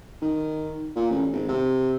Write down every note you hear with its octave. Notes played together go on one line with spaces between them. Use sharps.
D#3
A#2
A1
G#1
C3